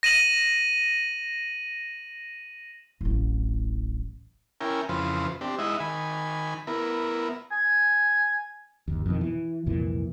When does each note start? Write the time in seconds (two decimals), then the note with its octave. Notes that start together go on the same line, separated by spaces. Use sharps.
0.03 A#6 D#7 E7 F#7
3.01 D1 A1
4.61 C#4 E4 A#4 G5 G#5
4.89 F2 C#3 E3 F4 B4 C5
5.41 C4 D4 G4
5.59 G#3 D#4 E4 D#5 E5 F#5
5.80 D#3 G#5 B5
6.67 B3 E4 A#4
7.51 G#5
8.88 G1 D#2
9.06 F2 B2 D#3
9.21 E3
9.66 C2 F2 A#2 E3